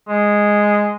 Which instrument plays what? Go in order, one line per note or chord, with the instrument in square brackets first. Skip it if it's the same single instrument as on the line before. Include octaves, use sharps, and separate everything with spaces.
[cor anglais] G#3